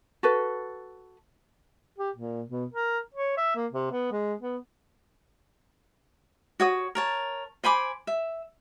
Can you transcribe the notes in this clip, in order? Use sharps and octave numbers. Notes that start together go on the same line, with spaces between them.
F#4 A4 B4
G4
A#2
B2
A#4
C#5
E5
A#3
C3
B3
G#3
B3
F#4 C#5 D#6
A#4 C#5 A5
C5 G#5 B5 D6
E5